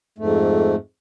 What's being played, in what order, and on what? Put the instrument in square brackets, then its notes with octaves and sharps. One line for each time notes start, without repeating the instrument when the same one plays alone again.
[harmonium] F2 G#2 A3